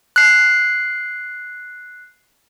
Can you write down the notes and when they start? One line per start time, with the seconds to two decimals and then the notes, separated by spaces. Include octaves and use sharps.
0.16 F#6 C7